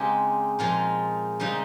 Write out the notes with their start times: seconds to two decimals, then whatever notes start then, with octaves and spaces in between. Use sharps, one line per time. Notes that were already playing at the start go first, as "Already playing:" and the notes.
Already playing: C#3 G#3 C4 D#4 G4
0.59 A#2 F3 G#3 D#4 F4
1.40 C#3 G3 C4 D#4